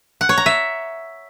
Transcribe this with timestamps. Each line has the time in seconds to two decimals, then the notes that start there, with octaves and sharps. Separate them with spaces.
0.21 F#5
0.29 C#5
0.38 A#5
0.46 E5